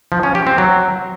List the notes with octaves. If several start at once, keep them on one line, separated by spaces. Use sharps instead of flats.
F3
C#4
G4
C4
F#3